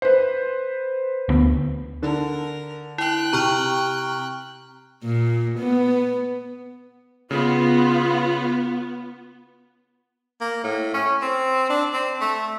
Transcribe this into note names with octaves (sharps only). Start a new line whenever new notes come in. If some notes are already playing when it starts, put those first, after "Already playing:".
B4 C5
D2 B3
D3 A#4 A5
E4 G5 F#6
C3 A#5 C#6 F6
A#2
B3
C#3 B3 F4
A#3
A2
C#4
C4
D4
C4
A3